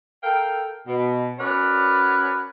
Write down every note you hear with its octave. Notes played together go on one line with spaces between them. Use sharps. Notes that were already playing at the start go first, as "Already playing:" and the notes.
A4 A#4 F5 G5
B2
C#4 F#4 A#4 B4 C#5 D5